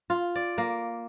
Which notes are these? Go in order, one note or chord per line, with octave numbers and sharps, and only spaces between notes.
F4
D5
A#3